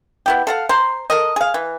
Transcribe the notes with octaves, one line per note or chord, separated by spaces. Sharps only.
B3 E4 G4
A4 F5 F#5
C5 A#5 C6
A4 A#4 D#5
G#4 F5
E3